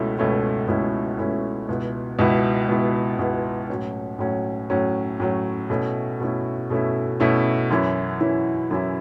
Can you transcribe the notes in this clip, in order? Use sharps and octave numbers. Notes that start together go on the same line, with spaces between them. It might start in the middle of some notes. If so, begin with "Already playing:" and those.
Already playing: C#2 B2 A3 C#4 E4
C#2 B2 A3 C#4 E4
C#2 B2 A3 C#4 E4
C#2 B2 A3 C#4 E4
C#2 B2 B3 E4
C#2 B2 B3 E4
C#2 B2 B3 E4
C#2 B2 B3 E4
A2 F#3 C#4
A2 F#3 C#4
A2 F#3 C#4
A2 F#3 C#4
B2 A3 C#4 E4
B2 A3 C#4 E4
B2 A3 C#4 E4
B2 A3 C#4 E4
F#2 E3 C#4 E4
F#2 E3 C#4 E4
F#2 E3 C#4 E4